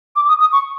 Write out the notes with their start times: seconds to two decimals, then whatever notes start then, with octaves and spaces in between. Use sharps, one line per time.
0.16 D6
0.28 D#6
0.41 D#6
0.52 C#6